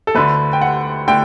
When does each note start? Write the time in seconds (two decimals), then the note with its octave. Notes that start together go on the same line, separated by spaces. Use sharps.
0.07 A4
0.15 D2 D3 A3 B4
0.53 G5
0.61 F#5
1.08 D3 A3 G5